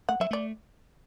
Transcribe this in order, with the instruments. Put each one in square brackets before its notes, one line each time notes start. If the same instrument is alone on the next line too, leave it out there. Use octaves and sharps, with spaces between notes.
[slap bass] A3 [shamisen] F#5
[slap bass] F#3 [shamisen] E5
[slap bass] A3 [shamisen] D5